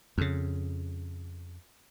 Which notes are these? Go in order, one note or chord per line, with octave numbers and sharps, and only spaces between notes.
F2 C#3